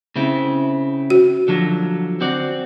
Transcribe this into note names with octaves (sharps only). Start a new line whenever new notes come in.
C#3 C4 E4
F#4
D3 F3 F#3
C4 F#4 D5